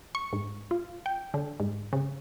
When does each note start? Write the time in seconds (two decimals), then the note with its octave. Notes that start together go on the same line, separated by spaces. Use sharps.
0.15 C#6
0.33 G#2
0.71 F4
1.06 G5
1.34 D3
1.60 G#2
1.93 C#3